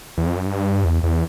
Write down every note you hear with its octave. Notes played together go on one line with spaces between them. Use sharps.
E2
F2
F#2
G2
E2
E2